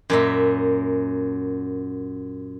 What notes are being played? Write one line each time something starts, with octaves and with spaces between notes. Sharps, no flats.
F#2 A#2 E5